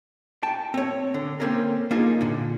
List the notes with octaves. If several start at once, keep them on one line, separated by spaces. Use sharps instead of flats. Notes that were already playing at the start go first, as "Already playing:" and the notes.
G5 A5
C4 C#5
D3
A#3 C4 C#4 A4 A#4
A#3 D4 D#4 F4 G#4
A#2 D3